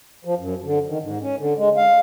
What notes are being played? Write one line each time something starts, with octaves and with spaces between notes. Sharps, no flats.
F3
F#2
D3
D#3
G#2
C#4
D3
G#3
F5